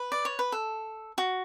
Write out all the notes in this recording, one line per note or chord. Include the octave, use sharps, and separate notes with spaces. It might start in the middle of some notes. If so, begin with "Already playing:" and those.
Already playing: B4
D5
C#5
B4
A4
F#4